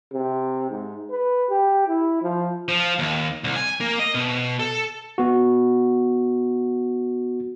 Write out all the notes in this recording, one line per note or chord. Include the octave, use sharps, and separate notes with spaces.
C3
G#2
B4
G4
E4
F3
F3
D#2
C2
G#5
A#3
D#5
B2
A4
B3 F#4